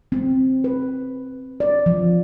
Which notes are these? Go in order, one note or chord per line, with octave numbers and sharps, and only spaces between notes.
C4
B4
D5
F3